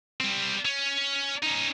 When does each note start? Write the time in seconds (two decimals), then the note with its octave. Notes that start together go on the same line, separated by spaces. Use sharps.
0.20 G3 C4
0.65 C#4
1.43 C#4 D#4